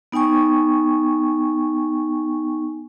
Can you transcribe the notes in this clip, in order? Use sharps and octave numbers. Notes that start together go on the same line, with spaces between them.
B3 D#4 G5 G#5 C#6